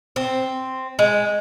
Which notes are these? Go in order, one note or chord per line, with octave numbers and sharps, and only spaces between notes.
C4
G#3